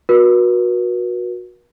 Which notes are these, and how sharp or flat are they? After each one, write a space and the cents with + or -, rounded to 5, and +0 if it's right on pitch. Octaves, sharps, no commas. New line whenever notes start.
F#4 -20 B4 -45